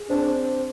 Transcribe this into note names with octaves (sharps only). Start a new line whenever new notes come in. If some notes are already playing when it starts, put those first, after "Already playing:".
Already playing: G#4
C4 D4